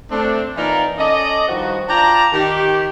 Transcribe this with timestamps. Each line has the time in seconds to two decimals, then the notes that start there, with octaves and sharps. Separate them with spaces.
0.11 A3 C4 D4
0.56 E3 A#3 D#4 F4 A#4 D5
0.98 C#4 A4 D5 D#5
1.48 G2 D#3 F3 F#4
1.88 D4 F4 D5 G5 A5 A#5
2.33 D#3 G4